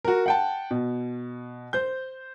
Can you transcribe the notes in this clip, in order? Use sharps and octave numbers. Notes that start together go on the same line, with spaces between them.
F#4 A#4
F#5 G5 A5
B2
C5 G6